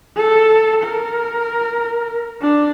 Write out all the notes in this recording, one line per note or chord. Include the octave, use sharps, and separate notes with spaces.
A4
A#4
D4